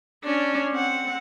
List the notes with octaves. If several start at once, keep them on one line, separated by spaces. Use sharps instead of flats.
C#4 D4
C4 F#5